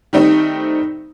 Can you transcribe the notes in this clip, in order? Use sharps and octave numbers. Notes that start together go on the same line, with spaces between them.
D#3 G3 A3 C4 D#4